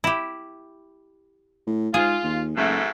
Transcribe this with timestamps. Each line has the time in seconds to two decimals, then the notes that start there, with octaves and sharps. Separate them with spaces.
0.04 E4 G4
1.67 A2
1.94 G#2 F4 G#4
2.23 D#2
2.57 F#1 G#2 B2 A3